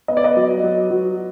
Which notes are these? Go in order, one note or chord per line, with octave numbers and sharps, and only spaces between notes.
B3 D#5
D5
B4 D#5
F#3
F#3
F#3